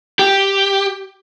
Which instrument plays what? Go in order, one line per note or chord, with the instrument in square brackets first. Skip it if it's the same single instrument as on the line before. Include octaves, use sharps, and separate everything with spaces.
[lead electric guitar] G4